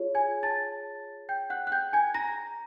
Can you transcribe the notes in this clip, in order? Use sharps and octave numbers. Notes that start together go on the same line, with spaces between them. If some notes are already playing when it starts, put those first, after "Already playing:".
Already playing: F4 G#4 C#5
G#5 G#6
A5 A6
G5 G6
F#5 F#6
F#6
G5 G6
G#5 G#6
A#5 A#6